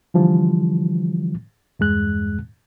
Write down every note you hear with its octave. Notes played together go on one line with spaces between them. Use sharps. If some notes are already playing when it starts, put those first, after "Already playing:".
D3 E3 F3 G3
E2 G2 G#3 F#6